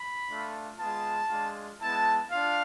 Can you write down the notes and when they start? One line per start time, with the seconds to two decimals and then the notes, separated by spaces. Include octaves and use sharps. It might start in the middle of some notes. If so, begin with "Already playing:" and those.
Already playing: B5
0.29 A3 D4 F4
0.79 G#3 B3 F4 A5
1.30 G#3 D4 F4
1.80 G#3 B3 E4 A5
2.31 D4 F4 F5